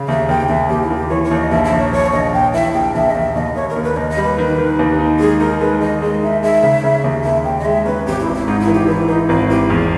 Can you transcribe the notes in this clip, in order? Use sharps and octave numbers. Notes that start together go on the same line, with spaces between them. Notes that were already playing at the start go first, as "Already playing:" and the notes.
Already playing: C#3
D#2 E5
D#2 G5
D#2 E5
D#2 G4
E4
D#2
G4
E3 C#5
C#5
D#2
D#5
A#1 E5
E5
A#1
C#5
A#1 C#5
A#1 D#5
A#1 G5
E3 E5
A#1 G5
A#1 E5
D#5
D#2 E5
D#2 D#5
D#2 C#5
A#4
D#2
B4
D#2 D#5
D#5
G3
B4
D#3
D#3
D#2
D#4
G#3 G#4
D#4 A#4
G#3 B4
D#3 D#5
G#3 D#5
D#4 E5
G#3 E5
C#3
C#3
D#2
D#2 E5
D#2 G5
D#5
G#3 E5
C#4 B4
G#1 G4
E4
G#1
E4
G#2 D#4
E4
E3
G4
E3 E4
E3 D#4
G#1 E4
E3 G4
E2 G#4